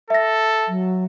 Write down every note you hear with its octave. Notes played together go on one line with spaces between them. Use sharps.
A4 E5 A#6
F#3